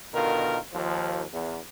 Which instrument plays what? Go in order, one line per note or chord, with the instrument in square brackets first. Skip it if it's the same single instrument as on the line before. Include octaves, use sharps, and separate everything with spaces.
[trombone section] B2 D3 D#3 F4 A#4
D#2 F3
E2